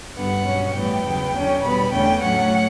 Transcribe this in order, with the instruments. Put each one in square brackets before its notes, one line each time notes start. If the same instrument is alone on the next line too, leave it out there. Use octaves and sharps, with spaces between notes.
[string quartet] G2 D3 G3 B3 F#5
B2 F#3 C#4
A2 E3 G3 B3 G5
E2 C#3 F#3 B3
E2 D3 F#3 C#4
B2 G3 B3 B5
E2 D3 A3 C#4 G5
A2 F#3 A3 C#4 F#5